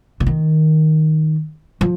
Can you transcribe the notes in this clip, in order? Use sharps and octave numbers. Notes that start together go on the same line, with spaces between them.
D3
D#3
F3